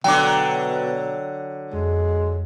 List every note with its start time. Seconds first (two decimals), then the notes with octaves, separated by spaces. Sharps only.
0.04 B2 D3 F#3 G5 D6
1.73 F2 G#3